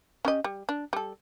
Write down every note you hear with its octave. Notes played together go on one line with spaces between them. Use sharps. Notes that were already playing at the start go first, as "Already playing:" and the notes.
C#4 G4 D#5
G3
D4
G3 A4